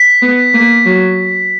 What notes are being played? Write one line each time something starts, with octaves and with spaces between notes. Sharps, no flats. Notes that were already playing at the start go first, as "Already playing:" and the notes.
Already playing: B6
B3
A#3
F#3